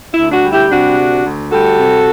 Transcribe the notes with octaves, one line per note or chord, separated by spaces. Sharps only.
E4
D2
D4 F#4
G3
E4 G4
C3 D4 F#4
D2
D2
G3 F#4 A4
C3